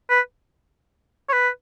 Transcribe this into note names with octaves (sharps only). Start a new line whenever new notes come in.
B4
C#5
B4